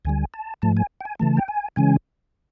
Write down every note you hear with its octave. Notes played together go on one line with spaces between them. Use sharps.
D2 D3 G3 G#5
A5
G#2 F3 A3 A5
G#5
G5
G#5
C#3 E3 A3 A5
G5
G#5
C#3 E3 G#3 C#4 G#5